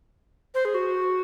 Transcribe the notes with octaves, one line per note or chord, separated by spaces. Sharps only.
C5
G#4
F#4